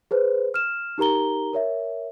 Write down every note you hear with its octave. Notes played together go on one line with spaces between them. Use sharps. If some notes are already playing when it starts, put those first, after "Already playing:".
G#4 B4 C5
F6 E7
D#4 G4 A#4 A#5 G7
A#4 C#5 E5